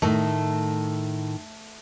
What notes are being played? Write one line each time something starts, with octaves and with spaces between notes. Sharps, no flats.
A2 D#3 A3